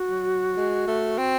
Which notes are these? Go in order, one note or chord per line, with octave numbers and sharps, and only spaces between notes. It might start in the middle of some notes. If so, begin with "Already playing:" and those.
Already playing: F#4
F#3
G#3
A3
C4